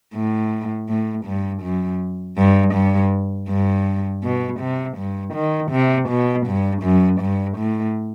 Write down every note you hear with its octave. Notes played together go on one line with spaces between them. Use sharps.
A2
A2
G2
F#2
G2
G2
G2
B2
C3
G2
D#3
C3
B2
G2
F#2
G2
A2